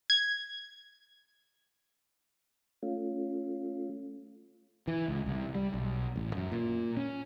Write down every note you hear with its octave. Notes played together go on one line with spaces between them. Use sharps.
G#6
A3 C#4 F4
E3
C#2
C2
G3
B1
A1
F#2
A#2
C#4